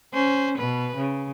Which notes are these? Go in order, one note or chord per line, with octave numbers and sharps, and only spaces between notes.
C#4 C5
B2 B4
C#3